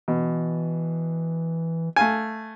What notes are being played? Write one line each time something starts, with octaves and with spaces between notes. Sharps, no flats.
B2 E3
A3 F5 G#5